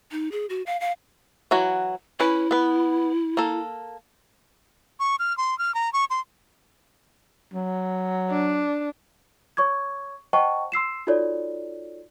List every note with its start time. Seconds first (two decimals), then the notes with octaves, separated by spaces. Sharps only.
0.12 D#4
0.32 G#4
0.50 F#4
0.66 F5
0.80 F5
1.51 E3 F#3 F#4
2.20 C#4 E4 B4
2.51 B3 B4
3.37 A#3 A4
5.00 C#6
5.19 F6
5.38 C6
5.59 F6
5.75 A#5
5.93 C#6
6.10 C6
7.54 F#3
8.30 D4
9.57 C#5 C#6 D6 G#6
10.33 C5 D#5 F#5 G5 A5 C#6
10.72 C6 E6 C7 E7
11.07 D#4 F4 F#4 A4 C#5 D5